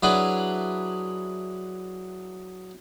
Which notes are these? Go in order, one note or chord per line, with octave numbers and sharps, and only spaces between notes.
F#3 D4 E4 G#4 B4